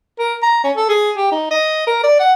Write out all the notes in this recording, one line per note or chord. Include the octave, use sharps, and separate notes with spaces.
A#4
A#5
C#4
A4
G#4
G4
D#4
D#5
A#4
D5
F#5